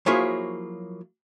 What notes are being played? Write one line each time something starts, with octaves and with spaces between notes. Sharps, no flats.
F3 F#3 A#3 E4 G#4 C#5